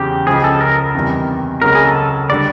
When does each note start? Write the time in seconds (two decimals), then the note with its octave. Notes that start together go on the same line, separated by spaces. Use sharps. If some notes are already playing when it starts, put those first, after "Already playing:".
Already playing: E2 C#3 F#3 G4
0.27 C#2 C#3 F3 G#4
0.44 A4
0.61 A#4
0.95 E2 C3 D#3 G3
1.62 C#2 C#3 F#3 A#3 A#4
1.75 G#4
1.85 A4
2.30 D3 G3 D5